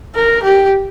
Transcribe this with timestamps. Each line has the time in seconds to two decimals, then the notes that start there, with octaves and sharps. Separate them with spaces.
0.15 A#4
0.43 G4